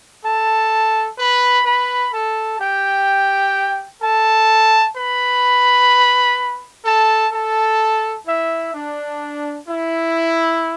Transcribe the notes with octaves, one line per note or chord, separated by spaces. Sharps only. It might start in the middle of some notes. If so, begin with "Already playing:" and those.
A4 A5
B4 B5
B4 B5
A4 A5
G4 G5
A4 A5
B4 B5
A4 A5
A4 A5
E4 E5
D4
E4